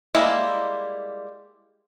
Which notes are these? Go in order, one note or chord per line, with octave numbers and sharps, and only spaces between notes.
G3 G#3 A#3 E4 D#5